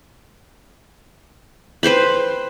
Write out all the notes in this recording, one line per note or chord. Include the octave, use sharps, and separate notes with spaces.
B4 C5 G5 B5